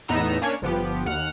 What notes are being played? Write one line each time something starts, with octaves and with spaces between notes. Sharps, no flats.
E2 A2 B3 D#4 A#5 E6
A#3 C#4 D4 C#5
G1 F3 B3 G4
D#2 F#5 F6